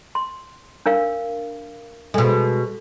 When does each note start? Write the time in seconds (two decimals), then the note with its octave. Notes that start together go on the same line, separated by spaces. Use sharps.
0.15 C6
0.86 D4 A#4 F5
2.14 B2 G#3 A4